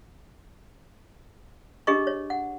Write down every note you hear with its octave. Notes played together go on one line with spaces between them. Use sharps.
D4 G4 G#4 A#4 D#5 C#6
C#5
F#5